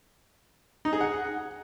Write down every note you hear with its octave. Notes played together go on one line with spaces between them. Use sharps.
D#4
G#4
F#5